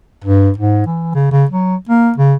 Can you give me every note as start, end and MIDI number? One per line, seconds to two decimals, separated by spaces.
0.24 0.50 43
0.58 0.85 44
0.87 1.12 52
1.15 1.31 49
1.32 1.45 49
1.51 1.76 54
1.89 2.12 58
2.18 2.34 49